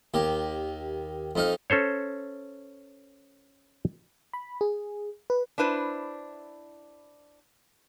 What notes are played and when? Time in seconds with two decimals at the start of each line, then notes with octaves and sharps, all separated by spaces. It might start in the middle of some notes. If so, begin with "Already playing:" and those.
0.14 D#2 G4
1.36 F2 D#4 F5
1.70 C#4 A4 C5 C#5
4.33 B5
4.61 G#4
5.30 B4
5.58 D4 E4 B4 C5